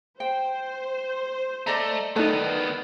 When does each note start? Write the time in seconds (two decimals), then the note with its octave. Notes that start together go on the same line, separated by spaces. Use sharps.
0.20 C5 G5
1.67 A3 D5 D#5 A#5
2.16 D#3 A3 B3 D#4 B4 D5